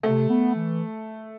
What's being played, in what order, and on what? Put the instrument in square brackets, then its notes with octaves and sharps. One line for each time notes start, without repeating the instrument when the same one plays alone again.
[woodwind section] C3 [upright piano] A3
[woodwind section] B3
E3